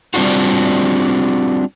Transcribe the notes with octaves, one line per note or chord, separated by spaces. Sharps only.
G3 C4 D4 F4 F#4